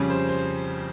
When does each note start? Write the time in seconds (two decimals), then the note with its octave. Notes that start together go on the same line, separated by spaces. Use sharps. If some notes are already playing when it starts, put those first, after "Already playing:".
Already playing: F2 C#3 G3 C#4
0.10 C5
0.29 C5